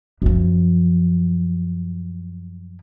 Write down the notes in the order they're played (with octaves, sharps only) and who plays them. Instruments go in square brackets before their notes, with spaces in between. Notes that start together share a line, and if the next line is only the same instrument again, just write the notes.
[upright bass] F#2 F3